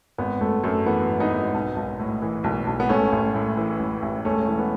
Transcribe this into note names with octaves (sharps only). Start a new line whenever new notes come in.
G#1 B3
G#1 A3
F#2 A3
E3 B3
G#1
B3 D#4
G#1
B1
B1
A2
E3
B1
B1
B3
A1 A3 C#4
A1
A2
E3
A1
A1
E1 A3 C#4
E3
B3